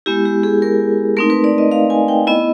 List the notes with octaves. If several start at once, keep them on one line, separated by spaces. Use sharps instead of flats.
G#3 B3 E4 G4
G4
G#4
A#4
A3 C4 D#4 A#4
B4
D5
D#5
F5
G#5
G5
B3 E4 D#5